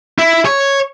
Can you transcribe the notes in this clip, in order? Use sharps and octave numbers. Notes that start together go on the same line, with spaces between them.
E4
C#5